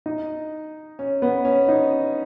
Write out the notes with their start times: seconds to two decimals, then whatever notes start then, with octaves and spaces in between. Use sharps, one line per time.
0.06 D#4
0.99 C#4
1.22 B3
1.45 C#4
1.69 D#4